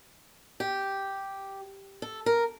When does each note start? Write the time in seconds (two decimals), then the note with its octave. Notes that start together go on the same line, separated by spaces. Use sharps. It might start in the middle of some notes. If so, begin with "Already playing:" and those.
0.60 G4
2.02 A4
2.26 A#4